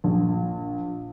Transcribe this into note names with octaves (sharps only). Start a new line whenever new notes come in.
A#1